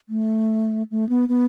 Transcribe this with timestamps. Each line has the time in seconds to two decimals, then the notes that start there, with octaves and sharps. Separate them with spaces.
0.09 A3
0.91 A3
1.09 B3
1.29 B3